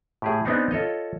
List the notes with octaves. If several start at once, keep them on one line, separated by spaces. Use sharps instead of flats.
A2 G4 G#4
B3 C4 D4 D#4 G#4
F4 A4 C#5 D#5